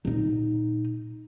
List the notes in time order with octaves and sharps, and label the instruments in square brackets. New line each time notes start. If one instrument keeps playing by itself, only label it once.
[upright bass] A#2 D#4